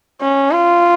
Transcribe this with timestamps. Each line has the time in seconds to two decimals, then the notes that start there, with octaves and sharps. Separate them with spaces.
0.21 C#4
0.52 F4